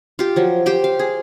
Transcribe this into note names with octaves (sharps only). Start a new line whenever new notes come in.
F4 G4
F3 F#3
G4 C5 G5
F5
G#4